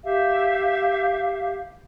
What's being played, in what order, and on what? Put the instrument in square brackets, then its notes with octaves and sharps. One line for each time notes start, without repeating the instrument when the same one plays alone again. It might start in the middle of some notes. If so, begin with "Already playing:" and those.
[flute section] G4 E5 F5